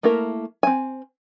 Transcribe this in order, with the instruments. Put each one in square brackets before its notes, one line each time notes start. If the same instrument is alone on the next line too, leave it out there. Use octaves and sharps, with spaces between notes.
[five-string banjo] A3 A#3 E4 A#4
C4 G#5